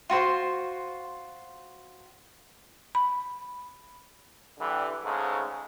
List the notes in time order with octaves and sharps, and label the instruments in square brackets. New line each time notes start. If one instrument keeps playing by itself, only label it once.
[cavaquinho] F4 F#4 C5
[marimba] B5
[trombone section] D3 E3 G3
G#2 C#3 G#3 A3